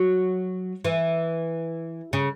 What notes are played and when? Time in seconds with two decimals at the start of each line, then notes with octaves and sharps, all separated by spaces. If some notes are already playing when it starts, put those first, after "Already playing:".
Already playing: F#3
0.85 E3
2.13 C#3